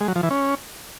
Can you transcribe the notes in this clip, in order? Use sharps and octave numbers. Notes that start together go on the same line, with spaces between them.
G#3
F#3
F3
E3
C#4